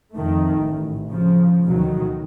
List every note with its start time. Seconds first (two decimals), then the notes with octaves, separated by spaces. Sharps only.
0.14 F2 D#3 A3
0.59 A1
1.10 C#3 F3
1.64 D2 B2 D#3 F#3